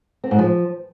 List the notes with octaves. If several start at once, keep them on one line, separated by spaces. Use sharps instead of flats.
C4
G#2
F3